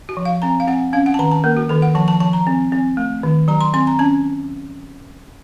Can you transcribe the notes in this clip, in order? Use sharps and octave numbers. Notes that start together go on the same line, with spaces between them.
F#4
F3
F5
C4 A#5
F5
C4 F#5
C#4 F5
F#5
A5
D#3 A#5
A5
A#3 A#4
F#4
D#3 A4
F#5
F3 A5
A5
F3 A5
A#5
C4
C4
A3
D#3
F#3 A#5
C6
C4 C6
A#5
C#4 A5